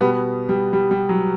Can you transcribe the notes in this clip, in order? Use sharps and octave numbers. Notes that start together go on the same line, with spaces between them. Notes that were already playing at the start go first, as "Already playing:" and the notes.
B2 G3 B3
G3
G3
G3
F#3